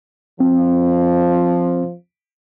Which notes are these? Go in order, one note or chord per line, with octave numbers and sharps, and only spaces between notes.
F3 C4